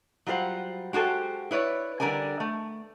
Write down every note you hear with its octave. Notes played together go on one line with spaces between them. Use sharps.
F#3 G3 F4 C5 F#5
G#3 F#4 G4 A4 C5
E4 B4 C#5 D5
D3 G3 A#4 D5 G#5
A3